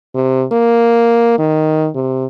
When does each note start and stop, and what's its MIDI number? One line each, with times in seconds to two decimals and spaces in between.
0.15 0.45 48
0.52 1.39 58
1.39 1.88 51
1.95 2.26 48